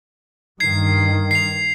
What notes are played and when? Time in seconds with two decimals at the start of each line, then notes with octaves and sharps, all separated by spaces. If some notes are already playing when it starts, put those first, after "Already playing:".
0.60 G2 D#3 G#6 C7
1.31 C7 F7